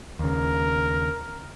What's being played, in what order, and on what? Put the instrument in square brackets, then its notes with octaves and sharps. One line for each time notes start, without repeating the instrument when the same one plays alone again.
[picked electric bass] D#2 C#3 [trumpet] A#4